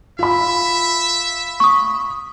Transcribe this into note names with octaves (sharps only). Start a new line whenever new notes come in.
F4 E5 B5
C#6 D#6